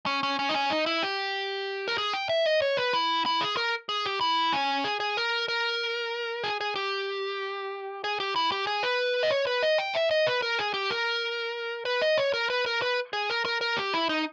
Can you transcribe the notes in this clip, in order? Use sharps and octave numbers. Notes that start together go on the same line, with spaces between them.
C#4
C#4
C#4
D#4
C#4
D#4
E4
G4
A#4
G#4
G5
E5
D#5
C#5
B4
E4
E4
G#4
A#4
G#4
G4
E4
C#4
G#4
G#4
A#4
A#4
G#4
G#4
G4
G#4
G4
E4
G4
G#4
B4
D#5
C#5
B4
D#5
G5
E5
D#5
B4
A#4
G#4
G4
A#4
B4
D#5
C#5
A#4
B4
A#4
B4
G#4
A#4
A#4
A#4
G4
E4
D#4